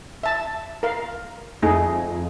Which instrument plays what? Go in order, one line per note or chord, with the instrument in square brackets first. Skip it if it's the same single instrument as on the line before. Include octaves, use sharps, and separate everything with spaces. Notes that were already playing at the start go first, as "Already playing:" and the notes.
[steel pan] E5 A5
A#4 F5
[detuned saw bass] F2 [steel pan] A3 D#4 G#4